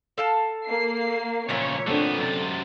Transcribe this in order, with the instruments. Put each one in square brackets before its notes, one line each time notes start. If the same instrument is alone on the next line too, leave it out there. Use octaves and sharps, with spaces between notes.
[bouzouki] A4 F5 A5
[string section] A#3 C7
[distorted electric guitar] C#2 F3 [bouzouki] A#2 E3 [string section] C#5
[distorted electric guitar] D3 B3 [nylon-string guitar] A3 C4 D4
[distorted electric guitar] F#2 C3 [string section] A6